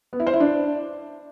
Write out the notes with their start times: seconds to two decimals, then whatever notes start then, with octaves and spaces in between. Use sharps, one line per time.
0.13 B3
0.20 E4
0.27 C5
0.33 E4
0.40 D4